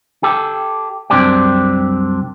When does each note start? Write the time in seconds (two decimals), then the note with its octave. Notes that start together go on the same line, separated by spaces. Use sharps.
0.23 G4 A4
1.10 C2 F#2 C4 D4 G4 G5